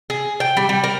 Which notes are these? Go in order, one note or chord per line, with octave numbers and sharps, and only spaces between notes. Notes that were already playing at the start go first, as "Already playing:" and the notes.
G#4
G5
G3
G3
A#4